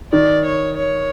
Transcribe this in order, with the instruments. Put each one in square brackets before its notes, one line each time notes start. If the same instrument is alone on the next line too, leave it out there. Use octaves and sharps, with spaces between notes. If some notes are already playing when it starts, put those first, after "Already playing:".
[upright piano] D#3 [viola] D5
[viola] C#5
C#5